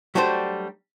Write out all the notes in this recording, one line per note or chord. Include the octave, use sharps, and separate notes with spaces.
F#3 G3 A3 D4 F#4 C5